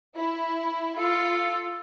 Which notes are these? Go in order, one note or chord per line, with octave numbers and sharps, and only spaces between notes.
E4
F4 A4